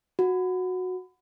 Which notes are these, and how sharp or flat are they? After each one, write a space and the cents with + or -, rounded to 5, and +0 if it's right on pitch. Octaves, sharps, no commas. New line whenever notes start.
F#4 -10